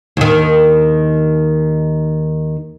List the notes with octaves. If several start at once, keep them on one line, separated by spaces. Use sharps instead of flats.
D#2 D#3